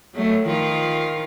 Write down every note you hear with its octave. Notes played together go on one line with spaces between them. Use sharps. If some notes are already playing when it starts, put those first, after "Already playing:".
F#3 A3
D#3 F3 F4